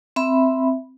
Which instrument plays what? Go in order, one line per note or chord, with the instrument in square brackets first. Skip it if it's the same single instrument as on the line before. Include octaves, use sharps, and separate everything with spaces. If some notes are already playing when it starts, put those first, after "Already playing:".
[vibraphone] C4 E5 B5